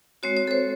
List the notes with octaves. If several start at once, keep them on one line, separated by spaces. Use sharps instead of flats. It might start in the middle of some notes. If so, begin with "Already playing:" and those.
G#3 C4 F#4 C#5
C#5
A4
C5